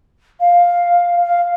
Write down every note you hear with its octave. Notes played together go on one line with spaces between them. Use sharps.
F5
F5